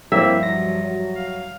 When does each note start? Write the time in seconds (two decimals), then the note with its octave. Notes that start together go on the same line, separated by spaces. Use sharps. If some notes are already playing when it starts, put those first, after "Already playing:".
0.12 G2 F3 A#3 C4 E4 E5
0.43 F#3 A#6
0.80 F#3
1.16 F5